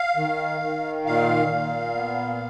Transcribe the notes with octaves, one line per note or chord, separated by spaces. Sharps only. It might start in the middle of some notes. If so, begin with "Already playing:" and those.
Already playing: F5
D#3
D#3
A#2 F5
A#2
B3